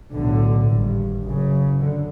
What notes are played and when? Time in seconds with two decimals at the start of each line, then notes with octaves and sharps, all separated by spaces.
0.13 B1 A2 D3
0.69 G#1 G2
1.25 F#1 F#2 C#3
1.81 D3